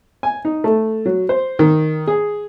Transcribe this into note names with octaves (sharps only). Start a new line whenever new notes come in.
G#5
D#4
A3
F#3
C5
D#3
G#4